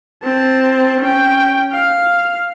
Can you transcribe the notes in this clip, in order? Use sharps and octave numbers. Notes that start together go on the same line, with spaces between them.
C4 A5
C#4 G5
F5